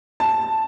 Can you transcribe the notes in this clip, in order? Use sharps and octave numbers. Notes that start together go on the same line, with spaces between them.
A5